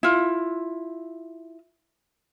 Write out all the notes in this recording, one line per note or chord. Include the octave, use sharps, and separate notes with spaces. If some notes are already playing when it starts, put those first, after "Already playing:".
E4 F4